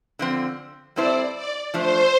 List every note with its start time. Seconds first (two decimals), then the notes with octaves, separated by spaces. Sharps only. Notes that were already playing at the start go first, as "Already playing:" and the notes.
0.19 D3 F3 C4
0.96 G3 C4 E4 A4 C5 D5
1.36 D5
1.73 F3 A3 D4 C5